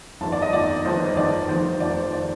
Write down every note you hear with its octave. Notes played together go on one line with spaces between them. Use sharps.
G1 F2 D#3 A5
D5
D#5
G1 F2 D#3 D5
G1 F2 D#3 C5
G1 F2 D#3 D5
F1 F2 D#3 C5
F1 F2 D#3 D5
C5
D#3 D5